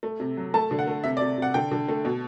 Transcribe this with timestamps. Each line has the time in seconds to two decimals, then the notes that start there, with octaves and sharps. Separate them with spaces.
0.03 A3
0.20 C3
0.37 F#3
0.54 A3 A5
0.71 D3
0.79 F#5
0.87 A3
1.04 C3 E5
1.17 D5
1.21 C3
1.38 C3 F#5
1.54 D3 G5
1.72 D3
1.88 A3
2.05 B2